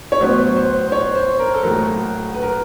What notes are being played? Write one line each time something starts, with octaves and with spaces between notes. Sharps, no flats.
C#5
A2 F#3 B3 C5
C5
C5
C#5
C5
A#4
A4
B1 A2 F#3 A#3 A#4
B4
A#4